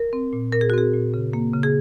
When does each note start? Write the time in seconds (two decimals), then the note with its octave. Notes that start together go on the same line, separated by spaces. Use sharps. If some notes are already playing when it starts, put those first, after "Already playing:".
Already playing: A#4
0.13 C4
0.33 A#2
0.52 A#2 A#4
0.61 G#4
0.70 F#4
0.73 C4 G#4
0.93 A#2
1.14 C#3
1.33 A#3
1.53 C#3
1.63 G#4